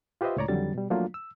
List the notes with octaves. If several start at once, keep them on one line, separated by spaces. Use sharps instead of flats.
F4 G4 B4 C5 D#5 E5
C#2 A2 C#5 D5 A#5
F2 D3 D#3 F#3 G3 A6
B2 G3
F3 F#3 A3 A#3 D4 F4
E6